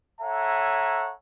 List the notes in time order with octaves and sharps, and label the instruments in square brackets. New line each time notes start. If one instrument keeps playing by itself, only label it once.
[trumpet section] A4 C#5 E5 F#5 G#5 A#5